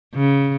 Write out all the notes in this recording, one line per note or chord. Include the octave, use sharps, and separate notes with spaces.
C#3